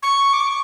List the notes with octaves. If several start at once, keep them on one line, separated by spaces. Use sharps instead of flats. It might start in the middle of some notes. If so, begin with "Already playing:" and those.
C#6
D6
C#6